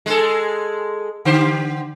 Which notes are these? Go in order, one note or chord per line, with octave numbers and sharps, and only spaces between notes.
G#3 G#4 A4
D3 G4 C5